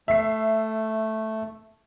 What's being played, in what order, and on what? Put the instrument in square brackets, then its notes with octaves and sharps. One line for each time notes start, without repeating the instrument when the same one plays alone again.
[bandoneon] A3 [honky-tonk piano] E5 C7